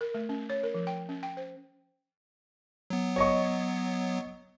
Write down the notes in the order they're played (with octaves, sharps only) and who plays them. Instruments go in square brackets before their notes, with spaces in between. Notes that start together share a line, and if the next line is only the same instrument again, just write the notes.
[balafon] A#4
A3
C#4
C#5
A#4
F3
G5
C#4
G5
C5
[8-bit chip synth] F#3 B3
[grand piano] C#5 D#5 C#6